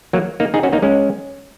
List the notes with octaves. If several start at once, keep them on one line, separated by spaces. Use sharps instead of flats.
F#3 A#3
A#3 D#4
D#4 G#4
C#4 F#4
A#3 D#4
G#3 C#4